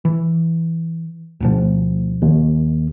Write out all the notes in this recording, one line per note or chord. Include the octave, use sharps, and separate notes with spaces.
E3
D2 B2 F3
D#2